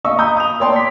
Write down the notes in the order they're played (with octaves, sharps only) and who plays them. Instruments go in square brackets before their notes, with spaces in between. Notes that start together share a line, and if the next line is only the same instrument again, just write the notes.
[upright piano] D#5 F5 C#6 E6
A#5 B5 D#6 E6 G6
D#6 F7
C#5 D5 G5 A5 C6
D6 B6